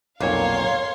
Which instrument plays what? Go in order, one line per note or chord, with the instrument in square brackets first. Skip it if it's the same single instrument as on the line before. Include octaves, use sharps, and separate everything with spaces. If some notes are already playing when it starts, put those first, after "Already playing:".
[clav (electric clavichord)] B1 F2 A#2 [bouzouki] A#3 [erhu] C#5 [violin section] F5 C6